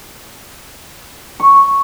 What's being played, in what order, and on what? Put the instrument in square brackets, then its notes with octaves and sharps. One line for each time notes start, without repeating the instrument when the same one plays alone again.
[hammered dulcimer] C#6